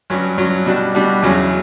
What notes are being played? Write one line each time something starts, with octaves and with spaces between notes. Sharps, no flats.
G2 F#3 C#4
G2 F#3 C#4
B2 G3 D4 F#4
B2 G3 D4 F#4
E2 C#3 F#3 C#4